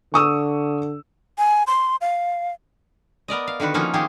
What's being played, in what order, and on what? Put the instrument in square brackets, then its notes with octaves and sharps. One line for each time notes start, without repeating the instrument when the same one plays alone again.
[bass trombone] D3 [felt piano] C#6 D#6 E6
[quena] G#5
C6
F5
[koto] B3 A#4 D5 D#5
F5
D3 D#3 F#4 B4
F3 A#3 C#4 D#4 F4 F#4
D#3 A#3 C4 G4 G#4